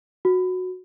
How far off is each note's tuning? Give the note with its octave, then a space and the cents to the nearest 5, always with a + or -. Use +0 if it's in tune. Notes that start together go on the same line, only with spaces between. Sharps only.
F#4 -10